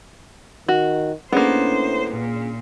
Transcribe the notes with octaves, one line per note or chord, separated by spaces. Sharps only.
D#3 F#4
A2 A#3 B3 C#4 D4 G#4 C5
A#2